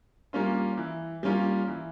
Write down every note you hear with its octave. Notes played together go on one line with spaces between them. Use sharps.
G3 A#3 C#4 F4
E3
G3 A#3 C#4 F4
E3